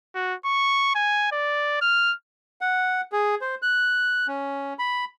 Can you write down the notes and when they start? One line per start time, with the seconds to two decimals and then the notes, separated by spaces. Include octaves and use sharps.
0.15 F#4
0.45 C#6
0.95 G#5
1.32 D5
1.82 F6
2.61 F#5
3.12 G#4
3.41 C5
3.62 F#6
4.28 C#4
4.79 B5